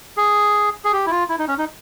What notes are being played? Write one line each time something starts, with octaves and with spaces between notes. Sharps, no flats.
G#4
G#4
G4
E4
F4
E4
D#4
C#4
D#4